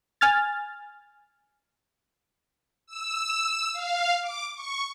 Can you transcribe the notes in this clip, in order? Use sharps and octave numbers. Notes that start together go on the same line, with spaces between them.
G#5 F6 A6
E6
F5
D6
C#6